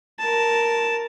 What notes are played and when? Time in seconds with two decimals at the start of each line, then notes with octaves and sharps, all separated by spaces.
0.19 A#4 A5